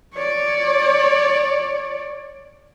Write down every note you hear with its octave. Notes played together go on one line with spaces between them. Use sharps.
C#5 D5